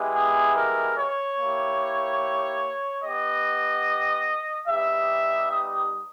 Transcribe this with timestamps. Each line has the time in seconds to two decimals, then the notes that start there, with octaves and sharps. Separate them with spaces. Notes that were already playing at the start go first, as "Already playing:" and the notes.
Already playing: G#3 B3 E4 G4
0.14 G#4
0.55 A#4
0.97 C#5
1.38 A#3 E4 G4
3.03 B3 G4 D#5
4.67 G3 B3 D#4 G4 E5
5.50 D#6